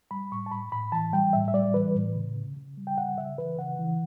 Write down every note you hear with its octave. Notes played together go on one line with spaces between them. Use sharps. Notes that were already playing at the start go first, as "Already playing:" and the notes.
G3 B5
A2 C#6
A5
A2 B5
A2 B5
E3 A5
G3 G5
A2 E5
E5
G3 D5
E3 B4
A2
C#3
C#3
C#3
G3
G5
C#3 F#5
C#3 E5
E3 B4
C#3 F#5
E3